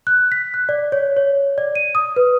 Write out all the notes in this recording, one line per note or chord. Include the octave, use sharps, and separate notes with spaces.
F#6
B6
F#6
D5
C#5
C#5
D5
D#7
D#6
B4